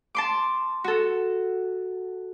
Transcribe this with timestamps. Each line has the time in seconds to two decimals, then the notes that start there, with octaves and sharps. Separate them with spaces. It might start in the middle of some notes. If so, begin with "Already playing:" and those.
0.15 A5 C6 D6
0.84 F#4 A4